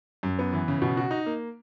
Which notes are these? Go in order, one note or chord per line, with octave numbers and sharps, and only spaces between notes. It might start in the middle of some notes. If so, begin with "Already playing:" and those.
F#2
B3
E3
C#3
B2
F#4
D#4
A#3